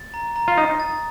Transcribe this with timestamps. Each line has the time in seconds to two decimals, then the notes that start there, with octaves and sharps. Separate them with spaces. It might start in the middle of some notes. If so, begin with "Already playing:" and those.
Already playing: A6
0.14 A#5
0.36 A#5
0.48 F4
0.57 D#4 D#6
0.80 A6